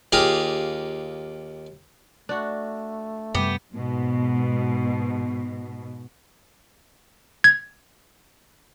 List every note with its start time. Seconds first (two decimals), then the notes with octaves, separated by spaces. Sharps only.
0.12 D#2 F4 G4 G#4 F5 A#5
2.29 A3 D4 F#4
3.35 F#2 C3 G3 B3 G4
3.72 G#2 B2
7.44 G#6